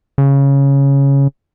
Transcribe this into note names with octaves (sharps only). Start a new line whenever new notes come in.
C#3